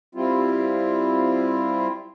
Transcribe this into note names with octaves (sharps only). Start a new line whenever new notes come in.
G3 C4 E4 F4